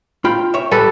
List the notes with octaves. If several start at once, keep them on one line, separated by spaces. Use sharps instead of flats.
F4 G5 B5
C#5 E5
G3 A4 B4